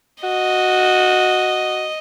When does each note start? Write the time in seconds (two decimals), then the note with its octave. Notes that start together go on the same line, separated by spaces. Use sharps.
0.24 F#4 D#5